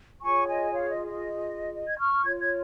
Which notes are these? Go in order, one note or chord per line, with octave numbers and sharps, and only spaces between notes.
F4 G#4 C#5 G#5 C#6
D#5 G#5
C#5 F5
D#5
D#5
D#5
G#6
C#6 F6
F4 C#5 G#6
G#6